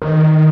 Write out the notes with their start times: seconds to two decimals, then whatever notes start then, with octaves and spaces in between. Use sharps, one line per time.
0.02 D#3